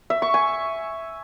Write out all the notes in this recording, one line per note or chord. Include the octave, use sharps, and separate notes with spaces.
E5
C#6
G#5